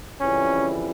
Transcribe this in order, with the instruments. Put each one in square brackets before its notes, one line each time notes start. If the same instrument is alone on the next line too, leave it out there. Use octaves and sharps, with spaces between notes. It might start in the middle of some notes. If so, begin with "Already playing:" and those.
[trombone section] F2 C#3 E3 G3 C#4